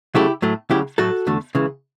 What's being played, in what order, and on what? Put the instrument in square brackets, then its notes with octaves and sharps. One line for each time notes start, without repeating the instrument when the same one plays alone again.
[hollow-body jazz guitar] C#2 C#3 F#3 A3 E4 G4
A2 F#3 A3
D2 C#3 F#3 E4 G4
A2 F#3 A3 F#4 A4
E2 D3 A3
C#2 C#3 E3